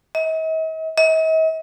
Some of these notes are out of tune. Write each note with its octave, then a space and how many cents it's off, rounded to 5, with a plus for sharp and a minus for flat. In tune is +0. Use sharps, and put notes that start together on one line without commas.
D#5 +45
D#5 +45